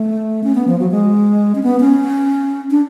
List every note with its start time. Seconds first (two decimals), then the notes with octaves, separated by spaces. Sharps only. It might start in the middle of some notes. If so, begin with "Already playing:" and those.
Already playing: A3
0.44 C#4
0.55 B3
0.68 F3
0.80 F#3
0.91 G#3
1.55 C#4
1.63 B3
1.80 C#4
2.71 D4